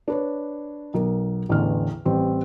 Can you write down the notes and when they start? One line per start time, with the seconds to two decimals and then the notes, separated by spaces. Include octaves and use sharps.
0.08 D4 B4 C#5
0.94 B1 A#4
1.49 A1 E2 A2 D3 F6
2.05 A1 G3 C4